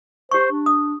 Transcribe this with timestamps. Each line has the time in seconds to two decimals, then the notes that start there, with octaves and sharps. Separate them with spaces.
0.31 G4 C5 C#6
0.51 D4
0.66 D#6